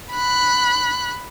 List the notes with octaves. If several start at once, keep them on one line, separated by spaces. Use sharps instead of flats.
B5 F#6